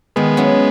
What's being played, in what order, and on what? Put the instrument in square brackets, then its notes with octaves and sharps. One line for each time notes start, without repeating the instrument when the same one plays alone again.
[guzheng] D#3 [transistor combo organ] G#3 B3
[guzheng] F#3 C#4 E4